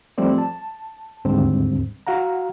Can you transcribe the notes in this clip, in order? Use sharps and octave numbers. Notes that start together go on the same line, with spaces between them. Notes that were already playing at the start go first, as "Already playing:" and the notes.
F3 G3 A3 C4 D5
A5
D#2 G#2 D3 G3 C4
F#4 F5 F#5 A#5